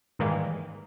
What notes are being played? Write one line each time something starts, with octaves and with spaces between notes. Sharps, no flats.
G#2 D#3 E3 G3 G#3 A#3